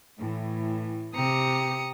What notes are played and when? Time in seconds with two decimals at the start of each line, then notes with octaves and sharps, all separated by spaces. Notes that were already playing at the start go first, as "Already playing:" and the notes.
0.18 A2 E3
1.15 C3 G4 A#5 D#6 C#7